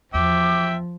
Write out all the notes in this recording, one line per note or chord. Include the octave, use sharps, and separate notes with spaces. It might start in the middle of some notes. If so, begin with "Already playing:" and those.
E2 F3 E5 G5 D6